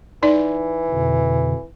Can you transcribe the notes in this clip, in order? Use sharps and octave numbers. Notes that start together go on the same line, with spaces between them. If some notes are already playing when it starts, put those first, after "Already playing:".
E3 D#4 D5
F2 B2 D3